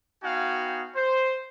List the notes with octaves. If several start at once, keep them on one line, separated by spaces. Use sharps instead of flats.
B3 D#4 F#4 F5 G5 G#5
C5